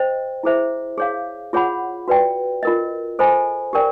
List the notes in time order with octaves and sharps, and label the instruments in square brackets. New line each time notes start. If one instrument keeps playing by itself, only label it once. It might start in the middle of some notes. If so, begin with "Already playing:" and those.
Already playing: [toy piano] C5 D#5 G5
E4 G#4 C5 E5
G#4 C#5 F5
F4 G#4 C#5 F#5 B5
F#4 B4 D5 G5
F4 A#4 D#5
A4 C5 D#5 G#5 B5
G4 A#4 D5 G5